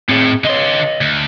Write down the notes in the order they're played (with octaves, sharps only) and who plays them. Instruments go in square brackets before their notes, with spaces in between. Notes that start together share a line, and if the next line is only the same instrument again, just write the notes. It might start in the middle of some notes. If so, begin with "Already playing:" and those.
[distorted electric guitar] A2 [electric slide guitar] C4 G#4
[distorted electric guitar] D3 C6 [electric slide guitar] C#5 D#5
[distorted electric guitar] D2